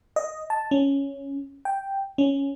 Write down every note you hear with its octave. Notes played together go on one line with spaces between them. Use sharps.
D#5
A5
C#4
G5
C#4